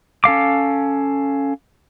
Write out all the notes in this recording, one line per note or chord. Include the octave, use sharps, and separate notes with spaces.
C#4 A4 F5 D6